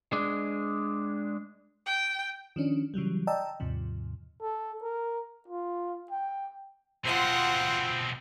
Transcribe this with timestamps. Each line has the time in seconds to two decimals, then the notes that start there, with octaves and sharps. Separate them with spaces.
0.13 G#3 D4
1.86 G5
2.56 D#3 F3 C#4 D4
2.94 C#3 E3 F#3 G3
3.27 D5 D#5 G5 A5 A#5 E6
3.60 D#2 G#2 C3 F3
4.42 A4
4.83 A#4
5.48 F4
6.11 G5
7.05 B2 F3 C4 F4 F#5